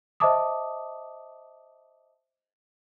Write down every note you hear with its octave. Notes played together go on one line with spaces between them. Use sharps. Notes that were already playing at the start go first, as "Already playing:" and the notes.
C5 D#5 E5 A5 D6 D#6